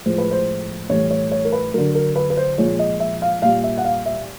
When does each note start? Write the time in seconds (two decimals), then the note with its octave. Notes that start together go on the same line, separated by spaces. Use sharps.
0.06 A2 F3 G#3 C5
0.18 B4
0.31 C5
0.89 A2 E3 G3 C#5
1.11 C#5
1.31 C#5
1.45 A#4
1.52 B4
1.74 D3 F#3 A#4
1.95 A#4
2.16 B4
2.30 B4
2.37 C5
2.58 A#2 F3 G#3 C#5
2.79 D#5
3.00 E5
3.22 F5
3.42 A#2 G3 F5
3.64 E5
3.78 F#5
3.85 F5
4.06 E5